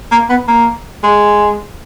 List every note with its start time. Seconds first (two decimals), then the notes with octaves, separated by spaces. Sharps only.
0.12 A#3
0.29 B3
0.48 A#3
1.03 G#3